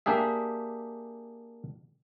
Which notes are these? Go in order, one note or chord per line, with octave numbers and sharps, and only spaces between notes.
A#3 D4 G4 G#4 E5